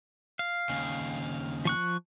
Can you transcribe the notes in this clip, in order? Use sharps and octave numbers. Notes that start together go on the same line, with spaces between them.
F5
D#2 C#3
F3 C#6 F#6